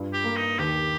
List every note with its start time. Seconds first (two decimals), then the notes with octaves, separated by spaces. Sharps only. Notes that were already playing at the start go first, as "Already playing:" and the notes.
Already playing: G2 F4
0.13 G4
0.24 A#3
0.36 D#4
0.59 D#2 G4